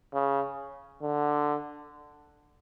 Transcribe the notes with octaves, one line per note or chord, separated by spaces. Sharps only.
C#3
D3